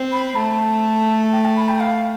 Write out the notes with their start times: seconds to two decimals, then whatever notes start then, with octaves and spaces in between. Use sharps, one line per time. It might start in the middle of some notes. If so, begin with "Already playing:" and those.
Already playing: C4
0.12 B5
0.36 A3 A5
1.32 G5
1.45 A5
1.56 B5
1.68 G5
1.80 F5